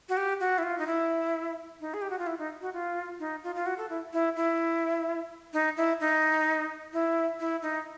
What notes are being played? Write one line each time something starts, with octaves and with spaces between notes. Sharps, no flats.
F#4
G4
F#4
E4
F4
D#4
E4
D#4
G#4
G4
F#4
F4
E4
D#4
F#4
F4
D#4
F4
F4
F#4
A4
E4
E4
E4
D#4
E4
D#4
E4
E4
D#4